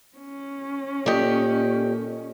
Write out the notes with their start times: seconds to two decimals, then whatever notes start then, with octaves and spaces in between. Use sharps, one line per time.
0.17 C#4
1.06 A#2 G4 A4 D5 D#5